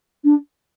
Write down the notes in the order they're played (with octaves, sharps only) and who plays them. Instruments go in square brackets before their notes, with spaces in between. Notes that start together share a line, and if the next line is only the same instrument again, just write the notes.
[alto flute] D4